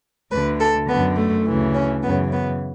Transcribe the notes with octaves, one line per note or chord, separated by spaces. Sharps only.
D2 D3 B4
A4
F#2 D3 B3
A3
D2 C#3 E3
C#4
F#2 C#3 E3 B3
B3